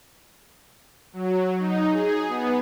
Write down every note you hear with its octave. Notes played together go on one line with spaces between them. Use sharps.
F#3
D#4
G#4
B3